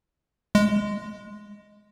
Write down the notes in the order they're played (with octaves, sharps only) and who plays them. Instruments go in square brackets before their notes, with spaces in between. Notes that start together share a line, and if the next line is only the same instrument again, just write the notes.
[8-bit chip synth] G#3